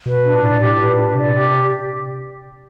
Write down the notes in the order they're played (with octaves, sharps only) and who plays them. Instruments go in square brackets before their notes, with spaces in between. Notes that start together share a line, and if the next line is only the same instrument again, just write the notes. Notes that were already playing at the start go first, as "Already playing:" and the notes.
[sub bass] B2 [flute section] B4
[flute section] D4
[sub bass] A#2
[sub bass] A2 [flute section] D5
[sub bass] A#2
[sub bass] A2 [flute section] G4
[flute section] B4
[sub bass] A#2
[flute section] D4
[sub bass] C3 [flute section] D5
[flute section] G4